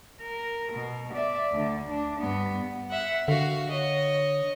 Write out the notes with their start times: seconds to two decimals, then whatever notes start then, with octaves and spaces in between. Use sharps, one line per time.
0.22 A#4
0.73 B2
1.14 D5 E5
1.52 D2 D3
1.90 D4
2.20 G2 B3
2.90 E5 F#5
3.28 D3 F#4 F5
3.69 C#5 D#5